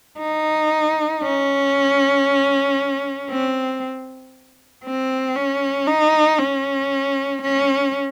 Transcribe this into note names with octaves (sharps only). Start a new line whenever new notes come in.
D#4
C#4
C4
C4
C#4
D#4
C#4
C#4